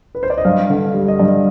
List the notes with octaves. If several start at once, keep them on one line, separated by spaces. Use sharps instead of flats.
B4
C5
D5
D#5
G2 F5
D3
G3
D#5
G2 D5